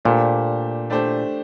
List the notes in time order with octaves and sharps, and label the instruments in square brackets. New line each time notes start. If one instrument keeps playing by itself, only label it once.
[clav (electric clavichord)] A#2 [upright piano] A3 D4 G4 C5
[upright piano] A3 D4 G4 C5